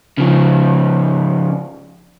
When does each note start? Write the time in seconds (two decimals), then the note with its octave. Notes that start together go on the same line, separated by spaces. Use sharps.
0.18 C#3 F3